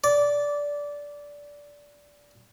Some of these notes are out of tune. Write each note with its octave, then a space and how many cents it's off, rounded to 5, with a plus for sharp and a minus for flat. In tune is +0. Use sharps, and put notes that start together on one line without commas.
D5 -15